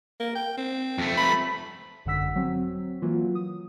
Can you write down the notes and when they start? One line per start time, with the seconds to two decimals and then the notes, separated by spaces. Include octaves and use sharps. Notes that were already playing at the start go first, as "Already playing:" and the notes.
0.20 A#3
0.36 G5
0.58 C4
0.98 F2 A3
1.18 B5
2.05 G#1 F#2 D3 F#5 E6 B6
2.35 F#3 C4
3.02 E3 F#3 A#3 F4
3.35 D#6